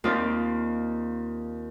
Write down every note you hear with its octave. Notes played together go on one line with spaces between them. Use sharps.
D#2 D#3 C4 D#4 F4 D5